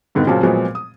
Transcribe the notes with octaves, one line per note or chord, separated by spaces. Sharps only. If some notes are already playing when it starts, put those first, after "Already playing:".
G2 D3 D#3 B3
A#2 C#3 F#3 C4 A5
A#2 F3 F#3 G#3 B3 C4
D#6